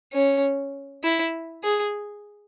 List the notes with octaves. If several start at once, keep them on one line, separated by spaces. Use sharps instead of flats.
C#4
E4
G#4